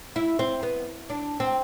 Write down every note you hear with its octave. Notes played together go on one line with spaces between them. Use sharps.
E4
C4
B3
D4
C4